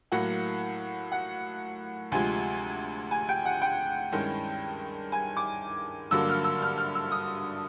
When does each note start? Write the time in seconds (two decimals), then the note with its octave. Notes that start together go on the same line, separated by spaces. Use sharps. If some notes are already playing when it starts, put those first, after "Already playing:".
0.12 A2 F#3 A#3 F#5
1.12 F#5
2.12 D2 C3 F3 G#3 G#5
3.11 G#5
3.29 G5
3.45 F#5
3.62 G5
4.12 G2 D#3 G#3 C#4 E4
5.12 G#5
5.37 D6
6.11 G2 D3 F#3 A#3 E6
6.29 F6
6.44 E6
6.62 F6
6.78 F6
6.95 E6
7.12 D#6